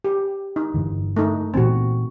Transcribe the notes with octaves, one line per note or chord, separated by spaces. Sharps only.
G4
D#4
G2 D3 E3
A3 D#4
A#2 E3 B3 C4 F#4